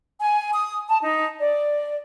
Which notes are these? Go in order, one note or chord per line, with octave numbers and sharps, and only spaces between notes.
G#5
D#6
A5
D#4
D5